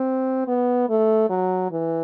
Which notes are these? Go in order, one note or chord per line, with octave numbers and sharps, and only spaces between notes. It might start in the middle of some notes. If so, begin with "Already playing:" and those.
Already playing: C4
B3
A3
F#3
E3